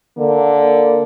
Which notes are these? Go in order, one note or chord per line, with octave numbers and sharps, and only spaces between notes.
D3 A#3